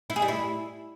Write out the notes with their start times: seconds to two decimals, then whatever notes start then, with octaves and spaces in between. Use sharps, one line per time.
0.10 E4
0.16 G#4
0.22 G3
0.28 E4